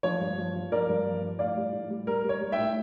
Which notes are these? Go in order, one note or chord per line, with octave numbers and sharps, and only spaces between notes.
F3 C#5
G2
F3
F3
F3 A#4 D5
G2
F3
F3
A2 D5 F5
G3
A2
G3
G3 A#4
G3
C#5
G3
E5 G5
A2